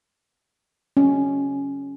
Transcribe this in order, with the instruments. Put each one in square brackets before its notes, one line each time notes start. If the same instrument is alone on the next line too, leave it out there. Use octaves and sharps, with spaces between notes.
[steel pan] C#4